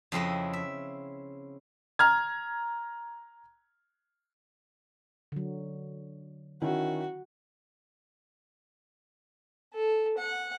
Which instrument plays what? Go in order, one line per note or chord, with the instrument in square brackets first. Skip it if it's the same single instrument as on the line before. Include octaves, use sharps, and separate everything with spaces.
[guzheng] F2 C#3 C4 E4 D#5
E5
[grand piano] A#5 F6 G#6
[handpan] D3 F#3
[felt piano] D#3 C#4 E4 [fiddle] F#4
[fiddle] A4
F#5